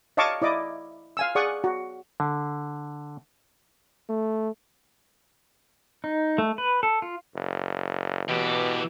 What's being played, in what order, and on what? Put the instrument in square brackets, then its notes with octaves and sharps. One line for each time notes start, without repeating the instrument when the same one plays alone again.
[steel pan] C#5 D#5 F5 A5 C#6 D6
E4 D5 D#5 D6
F5 G#5 E6
G#4 D5 F#5 C#6 D#6
F#4
[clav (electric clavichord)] D3
[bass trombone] A3
[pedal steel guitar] D#4
A3
B4
A4
F4
[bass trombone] F#1
[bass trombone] B2 [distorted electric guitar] E3 G4